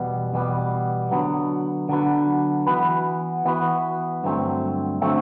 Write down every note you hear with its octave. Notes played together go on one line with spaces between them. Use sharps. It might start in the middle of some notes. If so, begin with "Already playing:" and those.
Already playing: E2 B2 G3 B3
E2 B2 G3 B3
D3 F#3 B3
D3 F#3 B3
E3 B3 F#4 B4
E3 B3 F#4 B4
G2 D3 F#3 A3 C4
D3 F#3 A3 C4